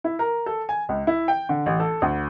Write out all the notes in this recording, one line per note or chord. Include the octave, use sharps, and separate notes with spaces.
E4
A#4
A4
G#5
C#2
E4
G5
D3
A1
A4
D2